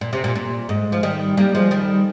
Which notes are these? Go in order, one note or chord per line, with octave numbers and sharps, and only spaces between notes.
A#2
C3
A#2
A#2
G#2
F3
D#3 G3
G3 A#3
F3 G#3
D#3 G3